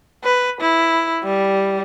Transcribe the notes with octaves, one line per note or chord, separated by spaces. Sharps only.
B4
E4
G3